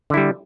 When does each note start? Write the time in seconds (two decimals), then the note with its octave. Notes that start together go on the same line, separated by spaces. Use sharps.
0.10 D3
0.14 E4
0.17 G3